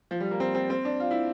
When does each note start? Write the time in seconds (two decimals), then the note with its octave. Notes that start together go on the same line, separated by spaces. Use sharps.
0.11 F3
0.20 G3
0.31 A#3
0.40 C4
0.55 C4
0.70 C4
0.85 D4
1.00 F4
1.11 E4